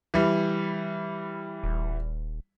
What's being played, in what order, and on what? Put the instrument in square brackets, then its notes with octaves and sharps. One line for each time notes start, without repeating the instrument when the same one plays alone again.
[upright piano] E3 G3
[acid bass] D#1